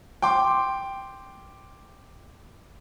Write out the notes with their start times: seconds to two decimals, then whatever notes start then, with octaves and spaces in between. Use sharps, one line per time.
0.22 G5 C6 D6